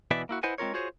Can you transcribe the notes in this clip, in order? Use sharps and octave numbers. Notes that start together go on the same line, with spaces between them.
B2 E3 B3 B4 D5 E5
A#3 E4 F#4
E4 B4 C5 D#5 F#5 G#5
G#3 C4 F4 A#4 C#5
F4 F#4 G#4 C5 C#5